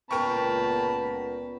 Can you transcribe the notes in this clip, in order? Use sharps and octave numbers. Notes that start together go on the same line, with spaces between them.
C#2 A#2 B3 A#4 G5 A5 B5 C#6